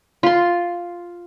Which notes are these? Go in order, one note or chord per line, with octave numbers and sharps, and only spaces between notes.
F4 C6